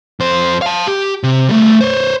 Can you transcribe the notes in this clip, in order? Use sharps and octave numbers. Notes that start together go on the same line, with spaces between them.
F2 C5
F5 A5
G4
C3
G3 A3
C5 C#5